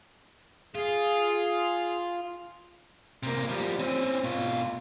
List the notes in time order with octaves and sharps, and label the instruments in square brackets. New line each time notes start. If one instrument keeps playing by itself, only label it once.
[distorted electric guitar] F4 [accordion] G#4
[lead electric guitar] C3 A#3
F3 G3
C4 C#4
B2 F4